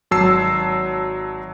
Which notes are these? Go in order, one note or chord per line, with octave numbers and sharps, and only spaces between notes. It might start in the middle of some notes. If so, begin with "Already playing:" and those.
G#1 F#3 A5 E6 C7